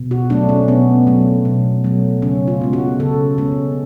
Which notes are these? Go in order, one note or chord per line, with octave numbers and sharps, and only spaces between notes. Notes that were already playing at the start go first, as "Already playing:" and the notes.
Already playing: B2
F#4
F#3 A3 D4
C#4
B2 B3
F#3 A3
B2
F#3 A3
C#3 C#4
F4
G#3 B3
F#4
C#3 A4
G#3 B3 C#4